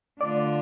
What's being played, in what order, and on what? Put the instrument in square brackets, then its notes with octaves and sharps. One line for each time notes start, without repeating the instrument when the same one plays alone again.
[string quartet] D3 A3 D4 F4 [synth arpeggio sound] D5